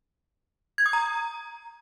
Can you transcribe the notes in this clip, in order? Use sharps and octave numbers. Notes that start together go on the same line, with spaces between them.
G#6
D#6
A#5